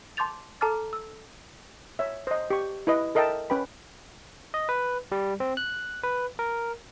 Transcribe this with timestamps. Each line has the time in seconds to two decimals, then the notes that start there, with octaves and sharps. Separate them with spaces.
0.17 A5 C6 D6 G6 A6 F7
0.61 A4 A5 A#5 D6 F6 A6
0.93 E6
1.99 C#5 E5
2.27 C5 D#5
2.50 G4 C#6
2.87 E4 B4 D#5
3.15 A4 A#4 D#5 E5 G5 A5
3.50 C#4 B4 G5 B5
4.54 D#5
4.69 B4
5.12 G3
5.40 C4
5.57 F#6
6.04 B4
6.39 A#4